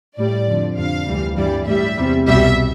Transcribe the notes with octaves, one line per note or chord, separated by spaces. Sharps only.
A2 G3 D5
F2 D3 F3
F2 D3 F3 F5
D2 C3 E3 G3
G2 E3 G3 D5
A2 G3 E5
E2 C3 G3
C2 B2 G3 E5